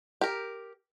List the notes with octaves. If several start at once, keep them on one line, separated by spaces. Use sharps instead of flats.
G4 A#4